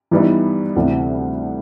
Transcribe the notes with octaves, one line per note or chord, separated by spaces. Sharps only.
G2 E3 G3 B3 D#4
D2 C3 E3